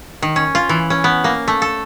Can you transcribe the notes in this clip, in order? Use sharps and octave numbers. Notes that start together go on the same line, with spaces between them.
D#3
C#4
F4
E3
C#4
B3
A#3
A3
A4